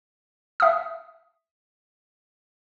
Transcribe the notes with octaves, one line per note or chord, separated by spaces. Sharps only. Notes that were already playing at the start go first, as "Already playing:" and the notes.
E5 D#6